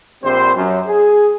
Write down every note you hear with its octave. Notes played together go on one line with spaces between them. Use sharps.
A#1 G3 C4 C5
F#2
G#4